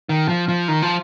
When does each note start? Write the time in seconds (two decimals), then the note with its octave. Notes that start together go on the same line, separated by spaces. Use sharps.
0.09 D#3
0.29 F3
0.49 F3
0.68 D#3
0.82 F3